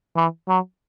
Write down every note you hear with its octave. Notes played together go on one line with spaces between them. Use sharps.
E3
F#3